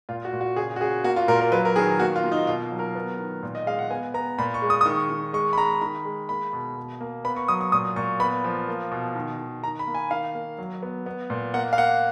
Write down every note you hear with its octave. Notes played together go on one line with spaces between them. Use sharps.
A#2 F4
F#4
A#2
F#4
C#3 G#4
F#4
C#3 G#4
A#3 F#4
F4
A#2 A#4
A#4
F#3 B4
A#4
D#3 G#4
A#3 F#4
F4
A#3
D#4
B2 F4
F#3
A#4
B3
D#3
A#2
D#5
G#3 F5
F#5
B3 G#5
B3 A#5
A#2 B5
C#6
G#3
D#6
D#6
D#3 C#6
D#3
G#3 C#6
B5
G#3 A#5
D#3 B5
G#3
A#3 B5
B2
B2
A#3
B3 B5
C#6
F#3 D#6
C#6
A#2 D#6
A#2 C#6
B3 B5
F3
A#3
B2
D#3
D#3
D#3 A#5
B5
A#3
G#5
D#3 F5
A#3
F#3
B3
B3
A#2
A#3 F#5
F5
A#3 F#5